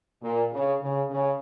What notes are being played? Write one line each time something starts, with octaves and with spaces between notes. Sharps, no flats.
A#2
C#3
C#3
C#3